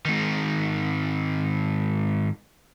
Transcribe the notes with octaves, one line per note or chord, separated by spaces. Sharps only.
G#2 D#3